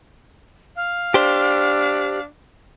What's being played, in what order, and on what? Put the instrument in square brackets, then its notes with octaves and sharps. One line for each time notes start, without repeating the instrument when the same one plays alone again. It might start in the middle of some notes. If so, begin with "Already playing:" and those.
[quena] F5
[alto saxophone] D4 [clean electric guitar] G4 C5